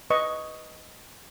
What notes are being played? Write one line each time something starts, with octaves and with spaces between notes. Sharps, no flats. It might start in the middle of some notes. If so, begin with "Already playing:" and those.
B4 D#5 C#6